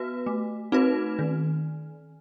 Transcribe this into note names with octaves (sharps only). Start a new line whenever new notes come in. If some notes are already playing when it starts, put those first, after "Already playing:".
Already playing: B3 F#4 B4
A3
C4 D#4 F#4 B4
D#3